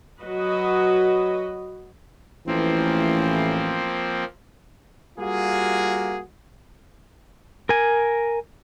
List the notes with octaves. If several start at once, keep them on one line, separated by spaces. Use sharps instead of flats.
F#3 F#4 B4 D#5
A1 A2 E3 F3 A#3 C4
G3 A#3 F4 F#4 G#4
A#4 G#5